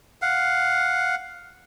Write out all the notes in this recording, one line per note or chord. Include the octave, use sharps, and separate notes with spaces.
F5 F#5